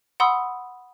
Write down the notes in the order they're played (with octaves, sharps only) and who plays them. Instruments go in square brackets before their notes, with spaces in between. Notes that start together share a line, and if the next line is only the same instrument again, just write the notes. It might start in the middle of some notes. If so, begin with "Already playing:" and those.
[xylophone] F#5 B5 C6 D#6 E6